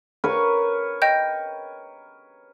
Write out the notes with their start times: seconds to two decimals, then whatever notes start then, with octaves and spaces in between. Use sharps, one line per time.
0.24 A#4 B4 C#5
1.02 D#5 G5 G6